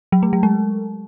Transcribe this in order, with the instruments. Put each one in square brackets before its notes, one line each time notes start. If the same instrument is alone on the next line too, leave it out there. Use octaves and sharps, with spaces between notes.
[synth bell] F#3
A3
F#3
G#3